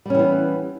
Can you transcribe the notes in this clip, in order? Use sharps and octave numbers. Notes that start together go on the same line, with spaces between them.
E3 G3 B3 C#4